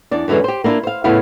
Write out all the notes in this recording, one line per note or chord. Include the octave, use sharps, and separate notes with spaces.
E2 D4 D5
F#2 D3 E3 G#3 C#4
G4 C5
A#3 D4 E4 F4
C5 F5
A2 C#3 B3 C#4 E4 F5